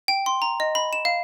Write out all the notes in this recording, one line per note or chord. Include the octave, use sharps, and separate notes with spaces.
G5
C6
A#5
D#5
B5
E7
F5